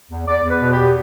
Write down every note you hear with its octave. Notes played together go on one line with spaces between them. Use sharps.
E2
E2 D5
E2
B4
B2
G4
E2